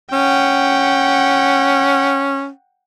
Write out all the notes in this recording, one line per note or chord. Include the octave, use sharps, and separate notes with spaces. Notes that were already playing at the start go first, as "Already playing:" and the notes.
C#4 F#5 G5